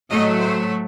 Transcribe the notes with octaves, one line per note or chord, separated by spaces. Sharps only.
A2 F#3 A3 D#5
C5